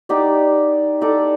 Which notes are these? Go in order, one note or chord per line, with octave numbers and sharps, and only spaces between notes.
D#4 G4 D5
D#4 A4 D5